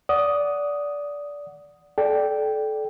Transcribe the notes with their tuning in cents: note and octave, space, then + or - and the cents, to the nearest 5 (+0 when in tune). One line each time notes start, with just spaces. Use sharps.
D5 -15 F#5 +0 D#6 +0
A4 -25 D5 +0 G5 -5